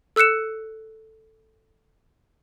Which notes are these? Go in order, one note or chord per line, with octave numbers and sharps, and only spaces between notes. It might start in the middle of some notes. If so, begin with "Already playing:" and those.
A4 E6 F#6 C#7 E7